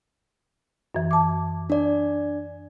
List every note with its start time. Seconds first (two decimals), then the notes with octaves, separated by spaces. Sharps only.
0.95 F#2 E3
1.11 A5 D6
1.70 D4 D5